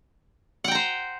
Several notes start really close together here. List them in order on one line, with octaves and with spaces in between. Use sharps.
F#5 G5 A#5 C5